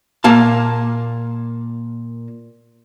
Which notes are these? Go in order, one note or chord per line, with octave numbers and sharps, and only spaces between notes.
A#2 A#3 F5 A5